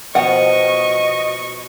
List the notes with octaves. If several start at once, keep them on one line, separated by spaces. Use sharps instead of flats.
B2 F3 B3 D#5 F#5 C#6